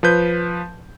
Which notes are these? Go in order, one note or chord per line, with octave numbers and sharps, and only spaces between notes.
F3 B4 G6